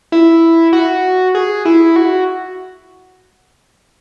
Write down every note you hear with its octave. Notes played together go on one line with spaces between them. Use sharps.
E4
F#4
G#4
E4
F#4